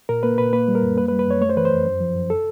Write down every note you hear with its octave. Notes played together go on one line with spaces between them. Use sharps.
A#2 A#4
A#3 B4
A#2 B4
A#3 B4
G3
A#4
F#2
A#3 B4
B4
G3
B4
F#2 C#5
A3 C#5
C5
E3 B4
C5
F2
F#2
F3
F#2
A4